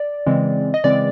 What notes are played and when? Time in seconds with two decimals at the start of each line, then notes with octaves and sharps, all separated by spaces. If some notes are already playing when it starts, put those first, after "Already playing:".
Already playing: D5
0.26 C#3 E3 G#3 C4
0.74 D#5
0.84 C#3 E3 G#3 C4 D5